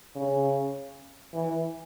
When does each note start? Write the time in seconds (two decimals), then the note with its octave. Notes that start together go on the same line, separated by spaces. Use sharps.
0.15 C#3
1.34 E3